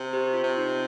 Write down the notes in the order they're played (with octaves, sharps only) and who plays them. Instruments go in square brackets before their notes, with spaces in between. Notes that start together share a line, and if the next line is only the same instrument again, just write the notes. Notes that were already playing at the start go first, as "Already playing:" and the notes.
Already playing: [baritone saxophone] C3
[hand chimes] G4 C5
G4
F4
[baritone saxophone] C3
[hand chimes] D#4